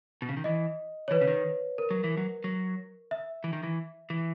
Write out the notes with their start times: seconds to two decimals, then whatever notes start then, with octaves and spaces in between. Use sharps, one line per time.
0.22 B2
0.29 C#3
0.37 D#3
0.44 E3 D#5
1.08 C#5
1.11 E3 B4
1.21 C#3
1.28 D#3
1.78 A#4
1.91 F#3
2.04 E3
2.17 F#3
2.44 F#3
3.11 E5
3.44 E3
3.53 D#3
3.63 E3
4.10 E3